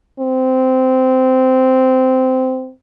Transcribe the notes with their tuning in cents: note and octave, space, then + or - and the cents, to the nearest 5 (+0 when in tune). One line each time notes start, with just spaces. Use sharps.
C4 -15